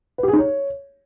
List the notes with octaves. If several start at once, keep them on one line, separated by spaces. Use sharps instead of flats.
B4
G4
G#4
D#4
C#5